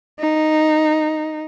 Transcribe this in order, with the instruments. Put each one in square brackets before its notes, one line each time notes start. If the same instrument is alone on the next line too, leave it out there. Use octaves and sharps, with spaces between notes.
[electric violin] D#4